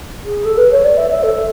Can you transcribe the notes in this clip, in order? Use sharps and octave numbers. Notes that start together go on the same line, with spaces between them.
G#4
A4
B4
C#5
D5
E5
E5
A4